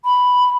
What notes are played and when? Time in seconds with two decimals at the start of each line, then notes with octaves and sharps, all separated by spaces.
0.05 B5